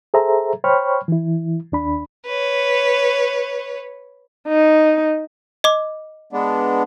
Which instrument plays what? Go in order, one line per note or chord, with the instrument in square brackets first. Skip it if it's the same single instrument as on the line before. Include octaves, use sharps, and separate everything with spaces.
[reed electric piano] G#4 A4 C5 E5 A#5
C5 C#5 G5 B5 C#6 F6
E3 E4
D#2 D4 B5
[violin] B4 C#5
[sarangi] D#4
[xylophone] D#5 D6
[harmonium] G#3 B3 D4